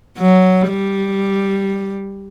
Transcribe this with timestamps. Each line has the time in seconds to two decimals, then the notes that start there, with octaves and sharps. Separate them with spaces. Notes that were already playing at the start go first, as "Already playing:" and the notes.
0.18 F#3
0.69 G3